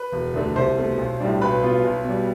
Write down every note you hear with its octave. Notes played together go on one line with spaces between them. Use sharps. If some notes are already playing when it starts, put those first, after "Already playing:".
Already playing: B4 B5
E1
D2 D3 A3
C2 C5 C6
B2 A3
B1
A2 G3 D4
B1 B4 B5
B2 B3 F4
B1
B2 G3